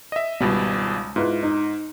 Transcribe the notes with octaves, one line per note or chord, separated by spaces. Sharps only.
D#5 E5
G#1 C#2 B2 G3
G#2 E4 F4 B4
D#4